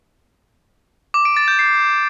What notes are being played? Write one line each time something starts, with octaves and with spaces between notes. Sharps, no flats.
D6
D7
A6
G6
C7